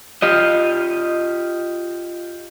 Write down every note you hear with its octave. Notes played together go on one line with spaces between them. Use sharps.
F4 G4 D#5